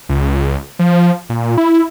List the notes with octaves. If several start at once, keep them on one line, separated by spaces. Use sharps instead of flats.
C#2
F3
A#2
E4